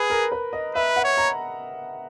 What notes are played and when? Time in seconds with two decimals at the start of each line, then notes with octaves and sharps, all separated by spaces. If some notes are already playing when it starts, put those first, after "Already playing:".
Already playing: G#4 B4
0.10 A#4
0.32 B4
0.53 D#5
0.75 B4 E5
0.96 F#5
1.04 C#5
1.17 A#5